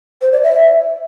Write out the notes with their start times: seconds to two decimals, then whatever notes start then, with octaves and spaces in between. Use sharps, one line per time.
0.22 C5
0.32 D5
0.43 E5